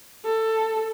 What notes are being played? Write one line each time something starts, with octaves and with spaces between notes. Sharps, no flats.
A4